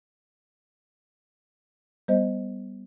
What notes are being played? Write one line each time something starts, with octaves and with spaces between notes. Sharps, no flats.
G3 B3 C5 D#5